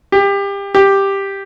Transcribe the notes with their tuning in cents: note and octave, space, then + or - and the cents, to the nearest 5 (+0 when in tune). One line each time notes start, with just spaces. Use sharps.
G4 +25
G4 +5